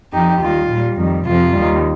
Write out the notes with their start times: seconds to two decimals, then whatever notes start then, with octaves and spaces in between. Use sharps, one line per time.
0.13 F2 F3 D#4 G4
0.41 D#2 D#3 G3 F4
0.70 A#2 G3
0.97 F2 D#3 G3
1.26 F2 C3 F3 F4
1.54 D#2 D#3 G3